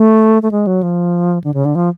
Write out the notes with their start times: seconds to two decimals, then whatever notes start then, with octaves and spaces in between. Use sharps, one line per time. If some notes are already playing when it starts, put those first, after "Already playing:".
Already playing: A3
0.42 A3
0.51 G#3
0.67 F#3
0.83 F3
1.44 D3
1.54 C#3
1.65 D3
1.75 F3